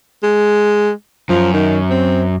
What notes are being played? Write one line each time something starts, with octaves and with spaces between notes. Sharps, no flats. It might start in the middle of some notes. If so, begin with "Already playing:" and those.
G#3
F#2 F3
D#3
C4